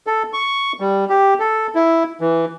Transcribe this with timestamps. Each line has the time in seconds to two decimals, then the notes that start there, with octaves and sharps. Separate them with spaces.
0.07 A4
0.33 C#6
0.80 G3
1.10 G4
1.39 A4
1.75 E4
2.21 E3